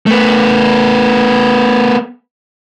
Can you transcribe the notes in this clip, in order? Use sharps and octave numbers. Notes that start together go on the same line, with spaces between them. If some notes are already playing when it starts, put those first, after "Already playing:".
A3 B3